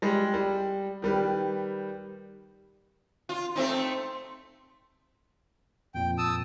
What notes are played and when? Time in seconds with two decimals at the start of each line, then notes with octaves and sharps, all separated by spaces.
0.02 G3 G#3
0.34 G3
1.02 D#3 G3 B4
3.29 F4
3.55 A3 C4 D#4
5.94 F2 A#2 G5
6.18 A5 D#6 E6